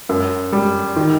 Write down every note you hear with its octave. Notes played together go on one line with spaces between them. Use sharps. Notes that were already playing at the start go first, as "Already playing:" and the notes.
F#2
G3
D#3